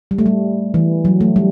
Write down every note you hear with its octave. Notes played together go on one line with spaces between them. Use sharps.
G3
A3
G3
E3
F#3
A3
G3